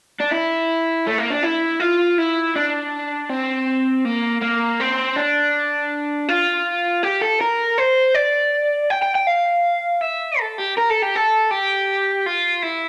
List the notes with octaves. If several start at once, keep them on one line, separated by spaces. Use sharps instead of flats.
D4
E4
A3
A#3
D4
E4
F4
E4
D4
C4
A#3
A#3
C4
D4
F4
G4
A4
A#4
C5
D5
G5
G5
G5
F5
E5
A4
G4
A#4
A4
G4
A4
G4
F4
E4